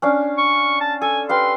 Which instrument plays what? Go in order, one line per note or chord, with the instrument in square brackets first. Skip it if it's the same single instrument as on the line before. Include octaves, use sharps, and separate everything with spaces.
[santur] C#4 D4 F5
[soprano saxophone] C#6
A5
[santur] A4 [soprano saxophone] G#5
[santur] G4 B4 F5 [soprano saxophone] C6